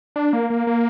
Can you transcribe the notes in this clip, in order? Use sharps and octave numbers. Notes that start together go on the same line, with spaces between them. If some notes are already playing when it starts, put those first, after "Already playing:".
D4
A#3
A#3
A#3